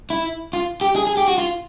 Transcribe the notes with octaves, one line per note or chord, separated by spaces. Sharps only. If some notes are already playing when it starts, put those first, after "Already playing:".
E4
F4
G4
G#4
G#4
G4
F#4
F4